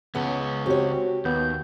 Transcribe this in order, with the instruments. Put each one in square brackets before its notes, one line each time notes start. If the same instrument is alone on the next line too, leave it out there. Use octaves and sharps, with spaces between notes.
[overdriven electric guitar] C#2 C#4 [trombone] C#3 [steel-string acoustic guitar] B3
[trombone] C4 [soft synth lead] F#4 [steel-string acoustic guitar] G4 C#5
[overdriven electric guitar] D#2 [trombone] B3 [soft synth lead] G6